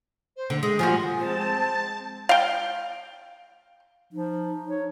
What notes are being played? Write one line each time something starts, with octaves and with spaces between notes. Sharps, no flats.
C5
D3
G#3 D#6
F3 G3 F#4 G#5
G#3 C4 C5 A5
F5 G5
F3 D#4
C#5